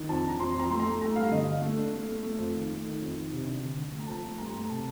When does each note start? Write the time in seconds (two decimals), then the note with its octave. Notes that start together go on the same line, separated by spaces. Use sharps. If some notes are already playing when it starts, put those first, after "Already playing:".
Already playing: D#3
0.09 F2 A5
0.23 D4 A#5
0.40 F2 C6
0.55 F2 A#5
0.70 A3 C6
0.80 A#5
0.85 A3
1.01 A3 A#5
1.16 G2 F5
1.31 D3 D#5
1.47 D4 F5
1.62 A3
1.77 D4
1.92 A3
2.08 A3
2.23 A3
2.38 F2
2.54 D#3
2.70 A3
2.84 D#3
3.00 F2
3.16 D#3
3.31 C3
3.46 D4
3.62 D3
3.77 D3
3.92 A3
4.00 A#5
4.07 F3 A5
4.24 A3
4.38 G2 A#5
4.46 C6
4.53 A3 A#5
4.69 C3 A5